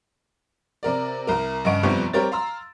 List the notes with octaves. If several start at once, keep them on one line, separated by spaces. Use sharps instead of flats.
C3 A#4 D5
C2 A#4
G2 C#3 D#5 F#5 C#6 D7
G1 F2 C3 G3 B3 C#6
G3 C4 G4 A#4 C#5 A6
F5 A#5 C6 E6